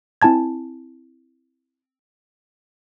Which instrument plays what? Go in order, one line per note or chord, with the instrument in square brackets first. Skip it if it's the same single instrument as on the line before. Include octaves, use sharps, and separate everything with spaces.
[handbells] C4 E4 G#5 A5 G#6